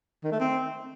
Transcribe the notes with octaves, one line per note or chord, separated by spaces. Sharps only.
D#3
A3
C4